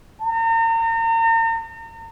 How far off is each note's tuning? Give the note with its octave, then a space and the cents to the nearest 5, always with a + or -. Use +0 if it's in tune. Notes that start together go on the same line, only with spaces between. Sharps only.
A#5 -40